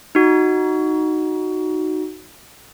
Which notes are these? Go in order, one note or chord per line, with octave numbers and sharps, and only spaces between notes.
D#4 F#4